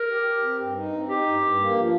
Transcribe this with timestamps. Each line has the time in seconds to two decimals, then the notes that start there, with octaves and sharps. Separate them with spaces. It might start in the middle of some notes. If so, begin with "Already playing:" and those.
Already playing: A#4
0.09 G4
0.26 G4
0.43 C4
0.60 G2
0.76 D#4
0.93 C4
1.09 D#4 G4
1.26 G2
1.42 G2
1.59 A#3
1.75 F3